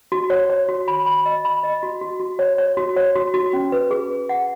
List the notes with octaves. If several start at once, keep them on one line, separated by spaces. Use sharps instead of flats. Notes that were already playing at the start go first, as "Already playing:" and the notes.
F#4
C#5
C#5
F#4
B5
B5
D#5
B5
D#5
F#4
F#4
F#4
C#5
C#5
F#4
C#5
F#4
F#4
C#4
B4
G#4
B4
F#5